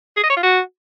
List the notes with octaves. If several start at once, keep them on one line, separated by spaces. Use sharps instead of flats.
G#4
D#5
C#5
F4
F#4